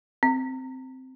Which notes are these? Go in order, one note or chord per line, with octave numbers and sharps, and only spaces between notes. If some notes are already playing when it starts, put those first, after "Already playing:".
C4